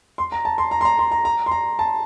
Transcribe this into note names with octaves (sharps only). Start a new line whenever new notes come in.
C6
A#5
A5
C6
A#5
C6
A#5
C6
A#5
A#5
C6
A#5
A5